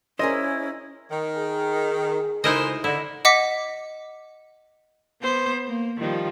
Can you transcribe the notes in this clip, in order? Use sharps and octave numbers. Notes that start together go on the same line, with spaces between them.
C#4 E4 G#4 A#4 C5 D#5
D#3
G#4
D2 C#3 G#3 D#4 E4 A#4 C5 D#5
D3 E4 A4 D#5
D#5 F#5 D6 B6
B3 C5
A#3
D#3 F3 G3